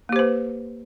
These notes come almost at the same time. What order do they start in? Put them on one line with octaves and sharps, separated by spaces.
A#3 G4 C5 B4